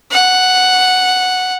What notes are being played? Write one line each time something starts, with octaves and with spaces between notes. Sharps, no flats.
F#5